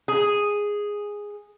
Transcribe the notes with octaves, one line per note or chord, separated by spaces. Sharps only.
G#4